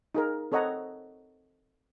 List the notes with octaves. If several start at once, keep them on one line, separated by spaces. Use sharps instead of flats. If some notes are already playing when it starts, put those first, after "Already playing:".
D#4 G#4 A#4
C4 A4 C#5 D#5 F#5 A#5